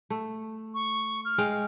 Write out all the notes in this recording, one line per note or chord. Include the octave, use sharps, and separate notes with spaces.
A3
C#6
F6
G#3 F5 G5